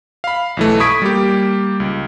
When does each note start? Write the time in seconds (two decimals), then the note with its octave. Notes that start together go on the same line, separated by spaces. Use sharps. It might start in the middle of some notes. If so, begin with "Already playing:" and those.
0.24 F5 B5
0.57 B1 E3 A3
0.80 B5 C#6 D#6 G#6 B6 D7
1.02 G3 A#3 G4
1.80 C#2